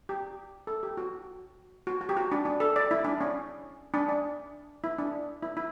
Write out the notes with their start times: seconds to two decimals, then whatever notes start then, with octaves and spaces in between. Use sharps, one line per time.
0.09 G4
0.67 A4
0.83 G4
0.97 F#4
1.87 F#4
2.01 F#4
2.09 G4
2.17 F#4
2.32 D4
2.45 D4
2.60 A4
2.76 D5
2.91 E4
3.05 D4
3.21 C#4
3.94 D4
4.09 D4
4.84 E4
4.98 D4
5.43 E4
5.57 E4